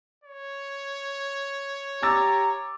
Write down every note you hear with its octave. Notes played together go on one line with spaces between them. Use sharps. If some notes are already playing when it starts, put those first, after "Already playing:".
C#5
G4 A#5 D6 E6 A6